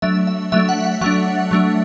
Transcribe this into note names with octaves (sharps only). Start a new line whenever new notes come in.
F#3 A3 D4 E5
E5
F#3 A3 D4 E5
F#5
F#5
F#3 A3 D4 F#5
F#3 A3 D4